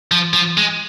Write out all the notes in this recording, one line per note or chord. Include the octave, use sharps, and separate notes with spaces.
F3
F3
G#3